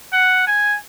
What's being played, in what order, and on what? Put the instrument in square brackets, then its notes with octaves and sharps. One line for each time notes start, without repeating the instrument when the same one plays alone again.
[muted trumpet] F#5
G#5